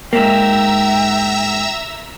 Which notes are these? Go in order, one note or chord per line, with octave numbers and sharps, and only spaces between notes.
G#2 A#3 E5 G5 A#5 E6